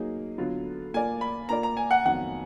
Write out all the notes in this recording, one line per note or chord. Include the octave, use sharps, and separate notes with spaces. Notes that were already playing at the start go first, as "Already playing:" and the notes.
Already playing: F#3 A#3 D#4 G#4
D3 F#3 B3 F4
A#3 F4 A#4 D5 G#5
B5
A#3 F4 A#4 D5 A#5
A#5
G#5
F#5
F2 D#3 F#3 B3 F#5